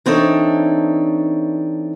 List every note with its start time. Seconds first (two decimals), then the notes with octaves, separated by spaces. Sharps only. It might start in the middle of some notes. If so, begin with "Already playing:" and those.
0.06 E3 C4 D4 D#4 A4 C#5